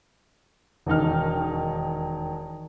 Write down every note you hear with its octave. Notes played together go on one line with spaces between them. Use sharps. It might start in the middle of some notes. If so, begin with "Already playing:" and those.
E1 D#2 D#4 F6